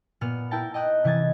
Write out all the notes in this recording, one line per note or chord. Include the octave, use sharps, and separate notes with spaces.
A#2 B3 F6
E4 A#4 G5 A5
D#5 G5 D#6 F#6
C3 E3 D#5 G#6 A6